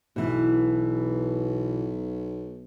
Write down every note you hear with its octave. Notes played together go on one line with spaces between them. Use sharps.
B1 B2 E3